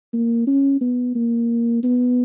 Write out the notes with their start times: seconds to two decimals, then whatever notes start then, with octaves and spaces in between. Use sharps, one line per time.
0.13 A#3
0.47 C#4
0.81 B3
1.15 A#3
1.83 B3